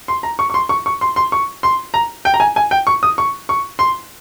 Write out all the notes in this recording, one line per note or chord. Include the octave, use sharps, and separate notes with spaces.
C6
A#5
C#6
C#6
C6
C#6
C#6
C6
C6
C#6
C6
A#5
G5
A#5
G#5
G#5
G5
C#6
D#6
C#6
C#6
C6